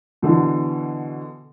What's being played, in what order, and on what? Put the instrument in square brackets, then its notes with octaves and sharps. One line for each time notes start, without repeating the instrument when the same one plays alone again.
[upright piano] B2 D3 E3